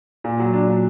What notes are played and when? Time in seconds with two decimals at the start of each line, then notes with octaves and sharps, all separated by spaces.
0.24 A#2
0.40 F#3
0.53 D4
0.68 A#2